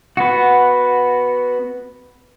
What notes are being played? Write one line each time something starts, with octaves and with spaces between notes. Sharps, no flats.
B3 F#4